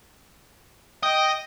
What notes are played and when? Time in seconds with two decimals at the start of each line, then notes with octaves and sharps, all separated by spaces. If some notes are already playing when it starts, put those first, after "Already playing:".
1.03 D#5 G5